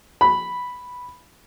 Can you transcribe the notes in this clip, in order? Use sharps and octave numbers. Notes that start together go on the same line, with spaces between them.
B5